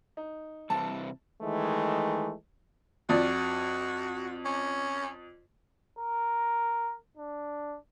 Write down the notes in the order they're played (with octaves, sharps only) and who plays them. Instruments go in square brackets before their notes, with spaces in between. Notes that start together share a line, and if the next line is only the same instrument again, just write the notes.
[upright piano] D#4
[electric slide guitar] C3 E3 G3 [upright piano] A5
[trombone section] D#3 E3 G#3 A3
[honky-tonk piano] F2 D5 [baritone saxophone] F#4
[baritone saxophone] C#4
[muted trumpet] A#4
D4